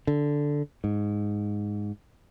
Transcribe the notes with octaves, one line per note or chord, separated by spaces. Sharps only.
D3
G#2